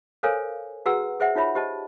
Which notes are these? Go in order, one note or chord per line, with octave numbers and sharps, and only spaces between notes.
A4 A#4 C5 C#5 F5 G#5
F#4 G#4 B4 F#5 A#5 E6
G#4 C5 E5 F#5
D#4 F4 C#5 E5 B5
G4 C5 D#5 A5